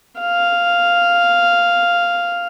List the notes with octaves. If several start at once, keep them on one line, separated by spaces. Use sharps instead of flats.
F5